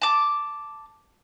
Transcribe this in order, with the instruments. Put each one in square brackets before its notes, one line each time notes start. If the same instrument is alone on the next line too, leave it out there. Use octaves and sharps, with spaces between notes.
[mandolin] A5 D6